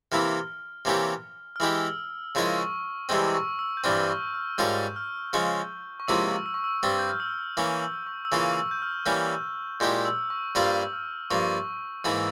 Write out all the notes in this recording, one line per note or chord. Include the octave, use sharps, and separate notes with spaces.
C3 E3 A#3 E4 F6
C3 E3 A#3 C#4 G4
F6
E3 G#3 E4 G4 E6
C#3 F3 G#3 E4 A#4 C#6
C#6
C2 C3 E3 G#3 C4 E6
E6
C#6
E6
G6
G2 E3 G3 C4 F6
C#6
F6
G#2 G3 C#4 F4 A#4 G6
F6
C#3 F3 G#3 C#4
C#6
C#2 C3 F3 A#3 E4 E6
E6
C#6
E6
G2 G3 C4 C#6
G6
F6
E6
E3 A#3 C#4 C#6
E6
C#6
E6
C#3 E3 A#3 F4 C#6
E6
G6
F6
E3 G3 A#3 C#4 G6
A#2 G#3 E4 G4 G6
E6
C#6
G2 G3 A#3 F4 C5 E6
E6
F6
G2 F3 A#3 C#6
G#2 E3 A#3 E4 E6